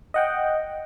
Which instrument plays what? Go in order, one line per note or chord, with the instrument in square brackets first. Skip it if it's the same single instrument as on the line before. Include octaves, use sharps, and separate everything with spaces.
[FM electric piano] D#5 F#5 G5